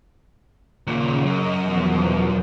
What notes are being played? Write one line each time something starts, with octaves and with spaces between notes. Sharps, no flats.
D#2 A#2 C#3
F#2 D#5
E2 B2 F3